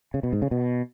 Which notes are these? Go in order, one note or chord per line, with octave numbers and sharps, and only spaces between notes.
C#3
B2
G#2
C#3
B2